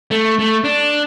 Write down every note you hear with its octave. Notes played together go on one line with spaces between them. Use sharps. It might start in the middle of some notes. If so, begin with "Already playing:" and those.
A3
A3
D4